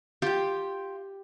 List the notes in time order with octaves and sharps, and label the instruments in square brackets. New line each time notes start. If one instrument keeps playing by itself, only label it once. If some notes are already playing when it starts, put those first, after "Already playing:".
[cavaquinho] F4 G5 [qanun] G4